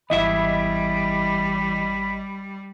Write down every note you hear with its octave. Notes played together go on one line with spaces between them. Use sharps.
G#1 E2 G3 E4 D#5 E5 B5